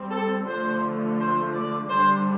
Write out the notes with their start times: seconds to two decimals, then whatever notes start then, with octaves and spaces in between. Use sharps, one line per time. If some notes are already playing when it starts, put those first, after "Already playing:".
Already playing: G3 C4
0.12 A4
0.47 D3 F3 A3 C5
1.19 C5
1.54 D5
1.89 D3 G3 D4 C5